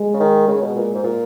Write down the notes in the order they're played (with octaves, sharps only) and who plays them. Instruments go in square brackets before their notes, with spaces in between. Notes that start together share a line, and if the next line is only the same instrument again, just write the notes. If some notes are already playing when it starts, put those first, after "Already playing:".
Already playing: [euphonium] G#3
[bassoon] C#3
D#3
[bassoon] C#3 [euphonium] G#3
[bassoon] B2
A#2
G#2
A#2